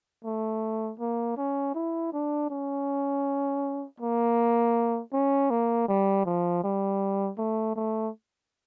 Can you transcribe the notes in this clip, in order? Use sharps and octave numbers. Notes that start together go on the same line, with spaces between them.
A3
A#3
C#4
E4
D4
C#4
A#3
C#4
A#3
G3
F3
G3
A3
A3